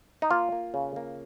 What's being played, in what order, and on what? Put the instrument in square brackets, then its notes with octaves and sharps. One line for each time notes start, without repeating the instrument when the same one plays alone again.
[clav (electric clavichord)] D#4
A#3 F4
A#3
C#3
A#3